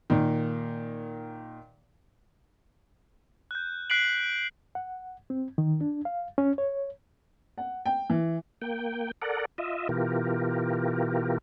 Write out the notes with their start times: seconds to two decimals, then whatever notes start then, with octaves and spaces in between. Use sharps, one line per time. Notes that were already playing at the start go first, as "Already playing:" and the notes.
0.10 A#2 D#3
3.51 F#6 G6
3.90 F#6 B6 C7 D7 F#7
4.75 F#5
5.30 C4
5.58 D#3
5.81 D4
6.05 F5
6.38 C#4
6.58 C#5
7.58 F#5
7.86 G5
8.10 E3
8.62 A#3 G5
9.22 A4 A#4 D5 F#5
9.58 F4 D#5 E5
9.89 B2 E3 F4 G4 A#4